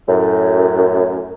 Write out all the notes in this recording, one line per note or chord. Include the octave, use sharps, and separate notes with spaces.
F#2 A2